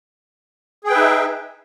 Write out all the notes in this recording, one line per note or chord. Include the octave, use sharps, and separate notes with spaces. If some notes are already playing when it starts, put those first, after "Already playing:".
D#4 G#4 B4 E5 G5